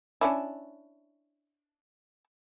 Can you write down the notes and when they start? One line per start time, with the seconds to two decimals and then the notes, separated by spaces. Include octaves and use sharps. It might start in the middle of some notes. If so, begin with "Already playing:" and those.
0.21 C#4 D4 E4